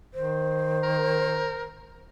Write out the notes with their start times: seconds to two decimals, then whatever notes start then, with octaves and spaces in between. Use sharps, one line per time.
0.14 D#3 C5
0.83 A#4